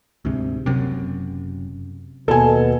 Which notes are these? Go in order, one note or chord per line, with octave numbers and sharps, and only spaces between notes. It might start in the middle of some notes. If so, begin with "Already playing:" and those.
D2 G#2 C3
F#1 F#2 C3
D#2 B2 A4 G#5